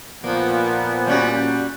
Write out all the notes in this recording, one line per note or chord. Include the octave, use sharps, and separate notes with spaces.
A#2 F3 A#3 B3
G3 C#4 F#4